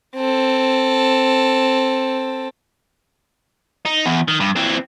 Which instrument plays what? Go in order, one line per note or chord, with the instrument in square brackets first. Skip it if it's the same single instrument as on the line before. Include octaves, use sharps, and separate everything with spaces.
[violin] C4 A4
[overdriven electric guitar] D#4
E2
D#3
G2
E3 C4